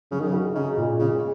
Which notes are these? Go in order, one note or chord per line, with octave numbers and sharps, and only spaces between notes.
C#3 F#3
D#3
C#3
F#4
C#3 D#4
A#2
C#3 G#3